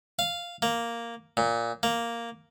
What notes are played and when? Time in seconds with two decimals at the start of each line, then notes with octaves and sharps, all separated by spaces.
0.19 F5
0.62 A#3
1.37 A#2
1.83 A#3